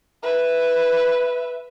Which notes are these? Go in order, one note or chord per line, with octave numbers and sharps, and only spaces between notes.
B4 E5